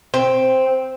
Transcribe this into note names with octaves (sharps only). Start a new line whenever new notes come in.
C4